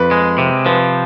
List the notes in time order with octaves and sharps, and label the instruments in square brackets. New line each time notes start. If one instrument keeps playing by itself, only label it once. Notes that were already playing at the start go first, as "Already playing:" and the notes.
Already playing: [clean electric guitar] F2 [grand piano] B4
[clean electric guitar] G#3
C3
[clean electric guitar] F3 [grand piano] B4